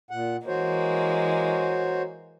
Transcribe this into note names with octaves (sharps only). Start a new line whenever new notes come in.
A#2 F#5
E3 G#3 A#3 F#4 C5 C#5